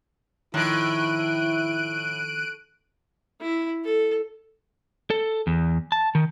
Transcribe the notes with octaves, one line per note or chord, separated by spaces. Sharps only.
A2 D#3 F3 E4 F#6 D7 D#7
E4
A4
A4
E2
A5
D#3